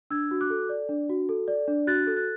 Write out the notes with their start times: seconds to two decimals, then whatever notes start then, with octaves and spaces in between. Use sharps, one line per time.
0.11 D4 E6 G#6
0.31 F#4
0.41 D6 F#6
0.50 A4
0.69 D5
0.89 D4
1.09 F#4
1.29 A4
1.48 D5
1.68 D4
1.87 F#4 F#6 A6
2.07 A4
2.16 F#6 A6